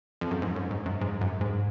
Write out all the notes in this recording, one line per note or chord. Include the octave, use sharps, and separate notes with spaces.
F2
F#2
G#2
F#2
G#2
F#2
G#2
F#2
G#2